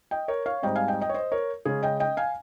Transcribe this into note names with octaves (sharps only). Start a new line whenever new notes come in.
D#5 G5
A#4 C#5
C#5 F5
G#2 G3 C4 D#5 G5
F5 G#5
D#5 G5
D#5 G5
C#5
C5 D#5
A#4 C#5
C#3 G#3 C#4 G#4
D#5 G5
D#5 G5
F5 G#5